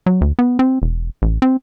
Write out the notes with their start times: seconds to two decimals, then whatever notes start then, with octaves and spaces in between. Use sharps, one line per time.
0.06 F#3
0.21 D2
0.39 B3
0.59 C4
0.82 E1
1.22 A1
1.42 C4